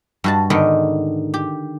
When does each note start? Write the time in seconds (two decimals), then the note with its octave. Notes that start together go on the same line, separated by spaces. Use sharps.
0.24 G2 F#4 A5
0.50 G#2 D3 D#3 B3
1.34 G4